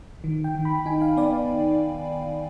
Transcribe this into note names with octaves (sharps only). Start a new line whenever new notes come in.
D#3
G5
D#3
B5
D#4 G#5
F5
B3 D5